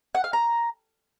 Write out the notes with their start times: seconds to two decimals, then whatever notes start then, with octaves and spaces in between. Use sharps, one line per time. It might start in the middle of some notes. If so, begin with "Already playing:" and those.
0.15 F#5
0.24 F5
0.33 A#5